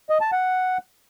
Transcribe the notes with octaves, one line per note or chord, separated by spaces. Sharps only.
D#5
A5
F#5